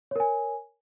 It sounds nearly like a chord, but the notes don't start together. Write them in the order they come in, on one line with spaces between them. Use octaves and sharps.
C#5 A#4 G#5